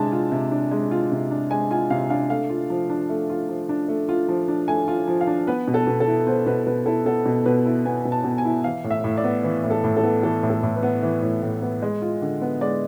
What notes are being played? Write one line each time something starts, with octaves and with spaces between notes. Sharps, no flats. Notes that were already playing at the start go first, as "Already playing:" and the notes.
Already playing: C3 G#3 D4 G#5 A5
F4
C3
D4
G#3
F4
C3
D4
G#3 G#5
F4 G#5
C3 F5
D4 F5
A3 F5
F4
F3
D4
A3
F4
F3
D4
A3
F4
F3
D4
A3 G#5
F4
F3
F5
D4
B3 B4
B2
A4
B2
A4
E4
B3 C5
B2 B4
B2 B4
E4 A4
B3 A4
B2
B2 B4
E4
B3 G#5
B2
A5
B2
G#5
E4
E3 F5
A2
E5
A2
D5
B3
E3
A2
A4
A2
A4
B3
E3 A4
A2
A4
A2
B4
B3
E3
A2
A2
B3
G#3
F4
D3
B3
G#3 D5